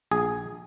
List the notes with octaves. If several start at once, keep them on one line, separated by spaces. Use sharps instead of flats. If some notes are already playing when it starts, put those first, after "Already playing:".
A#1 G#4